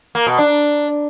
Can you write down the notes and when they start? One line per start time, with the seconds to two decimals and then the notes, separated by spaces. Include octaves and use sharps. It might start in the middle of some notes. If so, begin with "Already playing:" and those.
0.15 A#3
0.27 B2
0.38 D4